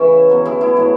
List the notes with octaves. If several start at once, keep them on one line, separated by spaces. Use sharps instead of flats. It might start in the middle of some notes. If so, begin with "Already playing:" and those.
Already playing: C#3 E3 C#4 E4
B2 F#3
E4 G#4
E4 G#4
A2 F#3